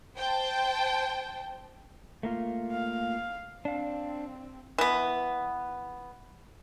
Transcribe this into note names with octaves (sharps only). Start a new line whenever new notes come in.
C5 G5 A5
A3 A#3 F4
F5
C4 D4 F5
E3 B3